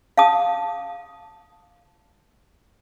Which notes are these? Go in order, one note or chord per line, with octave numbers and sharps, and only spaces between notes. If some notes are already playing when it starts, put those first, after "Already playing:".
F5 A5 D#6